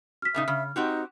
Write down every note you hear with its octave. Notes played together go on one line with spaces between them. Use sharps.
F6 B6
A#2 C#3 D#4 E5
C#3 F6
C4 D#4 F#4 G4